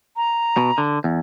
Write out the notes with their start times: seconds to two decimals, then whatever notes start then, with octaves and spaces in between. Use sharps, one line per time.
0.16 A#5
0.57 B2
0.78 D3
1.04 E2